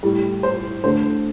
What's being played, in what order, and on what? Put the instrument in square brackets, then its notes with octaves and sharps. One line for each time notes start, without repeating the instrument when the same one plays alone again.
[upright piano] A2 G3
C5
D3 A3 C5